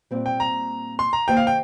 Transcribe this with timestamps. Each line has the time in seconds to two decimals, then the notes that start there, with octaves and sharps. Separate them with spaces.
0.11 A#2 G3 C4
0.26 G5
0.40 A#5
0.99 C6
1.13 A#5
1.28 D#3 A#3 G4 C5 D#5 G5
1.37 F5
1.47 G5